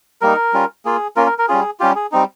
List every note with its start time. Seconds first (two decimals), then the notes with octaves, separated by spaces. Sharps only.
0.21 G3 A#3 D#4 A#4
0.54 G3 C#4 F4
0.85 A#3 F4 G#4
1.16 A#3 C#4 F4 A#4
1.27 A#4
1.38 A#4
1.48 G3 C#4 F4 G#4
1.80 G3 C#4 F4 G4
1.95 G#4
2.12 G3 C4 D#4